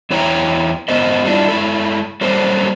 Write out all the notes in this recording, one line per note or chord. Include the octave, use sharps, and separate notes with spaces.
E2 E4 C#5 E5 G5 A#5
G#2 B3 A#4 C5 D#5
G3 B3 C#4 D4 E4 F4
G#3 E4 A4
F#3 G3 A#3 C4 A4 C5